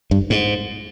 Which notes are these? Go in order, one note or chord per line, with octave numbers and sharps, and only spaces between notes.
G2
G#2